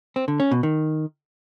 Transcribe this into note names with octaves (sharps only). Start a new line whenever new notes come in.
C4
D3
C#4
B2
D#3